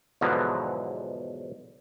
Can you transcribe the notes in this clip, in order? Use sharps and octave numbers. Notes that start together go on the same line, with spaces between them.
E2 G#2 B2 D3 F3 F#3